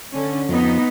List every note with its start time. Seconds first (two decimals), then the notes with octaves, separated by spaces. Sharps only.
0.14 D3 C#4
0.49 F2 B3 D#4